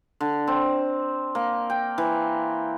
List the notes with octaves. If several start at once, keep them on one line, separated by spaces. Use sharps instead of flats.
D3
C4
A#3
G5
E3